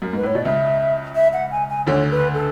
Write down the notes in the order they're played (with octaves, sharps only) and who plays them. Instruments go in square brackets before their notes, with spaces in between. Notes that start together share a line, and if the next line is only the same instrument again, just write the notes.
[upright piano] F#2
[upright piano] G#2 [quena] B4
[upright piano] A2 [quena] C#5
[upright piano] B2 [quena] D5
[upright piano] C#2 C#3 [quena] E5
[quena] E5
F#5
G#5
G#5
[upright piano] D2 D3 [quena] C#5
[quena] B4
A4